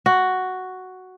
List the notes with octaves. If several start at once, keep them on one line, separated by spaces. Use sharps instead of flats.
F#4